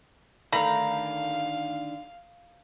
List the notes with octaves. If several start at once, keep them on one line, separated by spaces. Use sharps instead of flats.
D3 D#3 A3 F5 A#5 B5